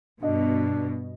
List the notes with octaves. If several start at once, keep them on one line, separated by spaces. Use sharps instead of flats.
G2 B2 D4 D#5